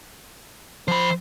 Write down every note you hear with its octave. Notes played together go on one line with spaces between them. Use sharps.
F3 C5 B5